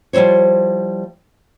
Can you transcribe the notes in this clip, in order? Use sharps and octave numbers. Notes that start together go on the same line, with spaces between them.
F3 G3 E4 C5 C#5